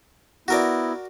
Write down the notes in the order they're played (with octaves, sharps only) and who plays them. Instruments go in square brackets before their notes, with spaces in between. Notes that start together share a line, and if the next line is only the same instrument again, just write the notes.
[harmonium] B3 E4 [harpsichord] F#4 A#4 D5